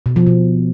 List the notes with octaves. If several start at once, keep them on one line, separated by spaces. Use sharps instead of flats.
B2
F3
B2